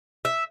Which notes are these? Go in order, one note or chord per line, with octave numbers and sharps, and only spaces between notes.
E5